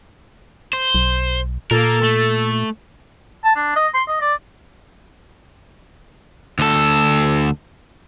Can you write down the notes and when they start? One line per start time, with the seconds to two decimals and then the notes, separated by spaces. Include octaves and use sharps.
0.73 C5
0.95 B1
1.71 A#2 A#3 A4 A#4
2.03 A3
3.44 A5
3.56 D4
3.76 D#5
3.94 C6
4.08 D#5
4.21 D5
6.59 D2 A4